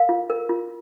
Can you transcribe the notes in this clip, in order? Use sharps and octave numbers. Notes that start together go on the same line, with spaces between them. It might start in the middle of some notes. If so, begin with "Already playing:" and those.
Already playing: A#4 F5
F4
A#4
F4